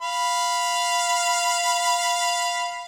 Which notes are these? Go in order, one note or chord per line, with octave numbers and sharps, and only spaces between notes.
F5 B5